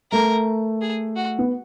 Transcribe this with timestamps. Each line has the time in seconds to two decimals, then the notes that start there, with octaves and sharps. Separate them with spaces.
0.11 A3 A#4
0.81 G#4
1.16 F#4
1.39 B3